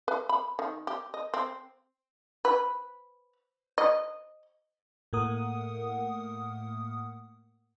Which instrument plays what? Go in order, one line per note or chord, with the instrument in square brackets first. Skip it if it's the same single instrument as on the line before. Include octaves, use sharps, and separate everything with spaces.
[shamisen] B4
B5
D#3
G4
D#5
C4
B4
D#5
[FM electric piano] A2 A3 A#3 A#4 F#5 D#6